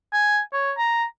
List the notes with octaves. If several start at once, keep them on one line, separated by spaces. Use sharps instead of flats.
G#5
C#5
A#5